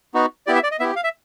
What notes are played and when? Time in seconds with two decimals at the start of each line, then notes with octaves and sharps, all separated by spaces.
0.14 B3 D#4 F#4
0.47 B3 E4 G4 D5
0.55 E5
0.63 D5
0.72 D#5
0.80 B3 E4 G4 E5
0.96 F5
1.04 E5